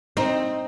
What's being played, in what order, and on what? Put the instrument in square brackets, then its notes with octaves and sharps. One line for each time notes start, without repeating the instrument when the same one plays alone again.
[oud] C4 D#4